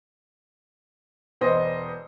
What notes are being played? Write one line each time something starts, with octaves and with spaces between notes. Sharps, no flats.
E1 B3 C5 D#5